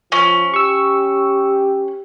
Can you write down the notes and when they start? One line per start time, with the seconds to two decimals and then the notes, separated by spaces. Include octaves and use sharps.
0.12 F3 C#4
0.54 G4 C#6 E6